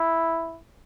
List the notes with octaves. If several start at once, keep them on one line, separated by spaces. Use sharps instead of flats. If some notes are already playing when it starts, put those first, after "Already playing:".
Already playing: E4